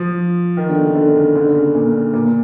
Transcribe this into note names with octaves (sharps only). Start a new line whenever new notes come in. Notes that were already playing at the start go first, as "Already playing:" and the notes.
Already playing: F3
D#3
D3
C#3
D3
C#3
D3
C#3
A#2
A#2